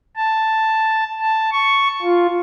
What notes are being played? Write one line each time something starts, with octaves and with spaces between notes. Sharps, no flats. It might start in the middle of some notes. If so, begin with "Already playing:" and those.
A5
A5
C#6
F4